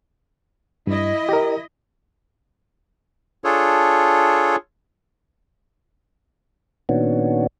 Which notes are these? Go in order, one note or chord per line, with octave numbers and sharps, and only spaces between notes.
G2 E4 D#5
G4 A#4
D4 F4 G#4 A4 C#5
A#2 D#3 B3 C#4 D4 F#4